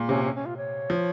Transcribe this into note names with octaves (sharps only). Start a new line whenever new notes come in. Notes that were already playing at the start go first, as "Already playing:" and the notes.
Already playing: A#2 G#3
C3 C#4
C#4
C#4
F4
C#5
F3